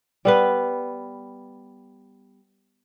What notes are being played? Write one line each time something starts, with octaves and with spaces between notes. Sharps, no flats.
G3 B3 B4